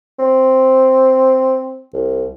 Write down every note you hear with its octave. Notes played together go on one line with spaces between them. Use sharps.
C4
C2